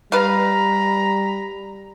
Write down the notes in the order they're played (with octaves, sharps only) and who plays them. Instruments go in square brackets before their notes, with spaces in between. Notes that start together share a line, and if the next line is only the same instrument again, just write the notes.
[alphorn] G3 [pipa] B4 F5 [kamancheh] A#5 B5